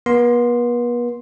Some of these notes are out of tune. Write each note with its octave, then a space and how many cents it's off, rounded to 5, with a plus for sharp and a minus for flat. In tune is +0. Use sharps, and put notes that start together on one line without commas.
B3 -40 C6 +0